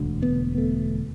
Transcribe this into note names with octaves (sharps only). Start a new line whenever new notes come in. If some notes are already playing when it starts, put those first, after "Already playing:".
Already playing: E1 D2 D3
B3
A3